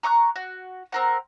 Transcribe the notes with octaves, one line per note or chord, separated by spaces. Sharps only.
A#5 C#6 D#6 F#6
F#4
C4 A#4 F#5